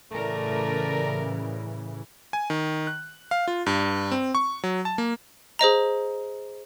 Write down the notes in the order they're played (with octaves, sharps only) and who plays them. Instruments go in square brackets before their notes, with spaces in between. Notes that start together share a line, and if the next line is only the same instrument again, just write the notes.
[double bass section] A2 C#3 E3 [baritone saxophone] A3 [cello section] A#4 D5
[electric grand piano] G#5
D#3
F#6
F5
F4
G2
C4
C#6
F#3
A5
A#3
[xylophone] G#4 C5 D#5 A#5